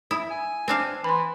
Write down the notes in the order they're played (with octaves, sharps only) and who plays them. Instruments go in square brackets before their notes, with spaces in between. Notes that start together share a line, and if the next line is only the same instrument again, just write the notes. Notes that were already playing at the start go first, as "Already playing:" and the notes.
[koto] E4 [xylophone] D#6
[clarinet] G#5
[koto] C4 D4 F5
[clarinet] E3 [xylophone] B5 C6